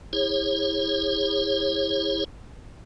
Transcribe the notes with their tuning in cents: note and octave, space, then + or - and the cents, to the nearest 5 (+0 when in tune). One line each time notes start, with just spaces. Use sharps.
E4 -20 G#4 -45 C#5 -30